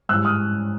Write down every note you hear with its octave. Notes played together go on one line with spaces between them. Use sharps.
G#2 E3 G3 E6 F#6
D#6 F6